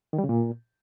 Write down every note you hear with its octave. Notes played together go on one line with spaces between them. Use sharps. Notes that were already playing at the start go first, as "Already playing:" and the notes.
D#3
G3
C#3
A#2